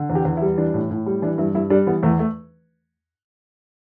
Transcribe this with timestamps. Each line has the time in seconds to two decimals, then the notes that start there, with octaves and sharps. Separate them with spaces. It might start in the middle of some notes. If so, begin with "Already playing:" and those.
Already playing: D3
0.10 E2
0.15 G4
0.25 E2
0.37 E4
0.42 G3
0.58 E3 D4
0.74 A2
0.91 A2
1.06 G3
1.22 E3 D4
1.38 G2 E4
1.55 G2 E4
1.70 G3 D4
1.87 E3 B3
2.03 E2 A3
2.19 A3